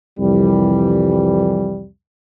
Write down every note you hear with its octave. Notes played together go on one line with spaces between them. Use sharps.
C2 F2 E3 G3